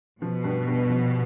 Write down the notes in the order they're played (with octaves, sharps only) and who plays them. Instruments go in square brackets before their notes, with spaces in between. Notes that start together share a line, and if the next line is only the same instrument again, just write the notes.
[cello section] B2 [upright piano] F3
[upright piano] G2
G2
F3